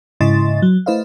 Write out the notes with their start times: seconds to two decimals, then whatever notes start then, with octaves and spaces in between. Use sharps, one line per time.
0.21 G#2 C#3 E4 D#5 C6 A6
0.62 F#3
0.86 A3 E4 B4 C5 D#5 F5